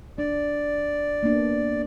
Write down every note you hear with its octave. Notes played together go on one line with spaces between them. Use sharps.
D4 D5
A#3 B3 D4